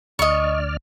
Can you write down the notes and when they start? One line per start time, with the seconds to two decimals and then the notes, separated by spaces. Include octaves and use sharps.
0.19 D2 D5 D#5 C#6 F6